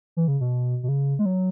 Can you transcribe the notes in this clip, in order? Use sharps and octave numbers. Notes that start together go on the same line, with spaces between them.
E3
C#3
B2
B2
C#3
G#3
F#3